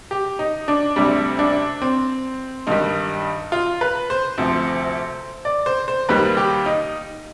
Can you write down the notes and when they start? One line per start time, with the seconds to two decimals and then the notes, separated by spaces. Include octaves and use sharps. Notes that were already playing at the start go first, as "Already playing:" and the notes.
0.11 G4
0.39 D#4
0.68 D4
0.96 D2 C3 G3 D4
1.39 D4
1.82 C4
2.67 G2 D#3 G3 D#4
3.52 F4
3.81 B4
4.10 C5
4.38 D2 C3 F3
5.45 D5
5.66 C5
5.88 C5
6.09 D#2 D#3 G3 B4
6.37 G4
6.66 D#4